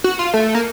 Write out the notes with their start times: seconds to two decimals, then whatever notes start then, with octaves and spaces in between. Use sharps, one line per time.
0.04 F#4
0.19 F4
0.34 A3
0.55 A#3